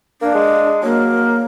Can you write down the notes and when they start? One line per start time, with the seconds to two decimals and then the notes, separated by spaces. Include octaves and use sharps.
0.22 A#3 D4
0.35 G#3
0.83 F#3 A#3